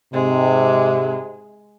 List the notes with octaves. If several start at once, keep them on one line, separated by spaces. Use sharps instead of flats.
G#2 C3 G#3